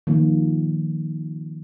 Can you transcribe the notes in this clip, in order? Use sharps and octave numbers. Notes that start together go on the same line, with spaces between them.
D#3 F3 A#3